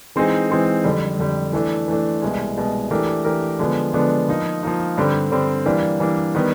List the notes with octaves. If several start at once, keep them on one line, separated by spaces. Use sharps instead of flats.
E3 G#3 C4 D#4 G#4
E3 G#3 C4 D#4 G#4
F2 D3 G3
F2 D3 G3
E3 A3 D4
E3 A3 D4
C2 B2 G#3
C2 B2 G#3
E3 A3 D4 G4 A#4
E3 A3 D4 G4 A#4
D3 F3 G#3 B3 D4
D3 F3 G#3 B3 D4
F3 A#3 D#4
F3 A#3 D#4
G2 D3 G3 C4
G2 D3 G3 C4
E3 G3 A#3 D4
E3 G3 A#3 D4
D#3 G3 B3